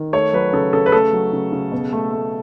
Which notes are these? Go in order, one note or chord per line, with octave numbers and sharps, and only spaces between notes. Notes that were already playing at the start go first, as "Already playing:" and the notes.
Already playing: D#3
A3 C#5
F#3 B4
C#3 A4
C#3 A4
B4
A3 A4
F#3
C#3
C#3
B2
A3
A3